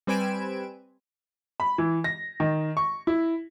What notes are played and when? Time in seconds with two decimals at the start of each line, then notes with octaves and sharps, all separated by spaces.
0.07 G3 C4 B4 G#5 D7 E7
1.60 B5
1.78 E3
2.04 A#6
2.40 D#3
2.77 C#6
3.07 E4